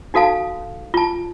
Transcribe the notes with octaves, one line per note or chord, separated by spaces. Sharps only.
D#4 F#4 A4 F5 A5
F4 A5